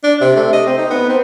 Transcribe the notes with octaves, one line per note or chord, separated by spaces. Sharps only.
D4
C3
A3
D#5
C4
D#4
B3
C4